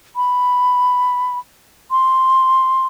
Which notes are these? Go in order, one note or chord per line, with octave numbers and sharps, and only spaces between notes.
B5
C6